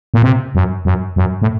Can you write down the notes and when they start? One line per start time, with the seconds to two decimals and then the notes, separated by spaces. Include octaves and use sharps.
0.14 A#2
0.23 C3
0.55 F#2
0.85 F#2
1.16 F#2
1.42 A2